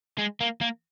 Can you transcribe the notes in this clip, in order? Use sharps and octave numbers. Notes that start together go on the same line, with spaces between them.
G#3
A#3
A#3